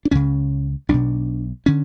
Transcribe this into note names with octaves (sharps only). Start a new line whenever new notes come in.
D4
C#2 C#3 C#4
B1 B2 D4
D3 C#4